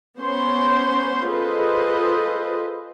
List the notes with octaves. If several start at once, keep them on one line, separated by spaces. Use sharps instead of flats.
B3 C#4 C5 C#5 C6
F4 G#4 A4 B4 C5 D#5